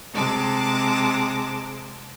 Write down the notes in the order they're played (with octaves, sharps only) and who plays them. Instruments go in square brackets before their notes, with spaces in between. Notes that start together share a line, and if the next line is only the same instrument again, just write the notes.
[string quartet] C3 G#3 A5 D6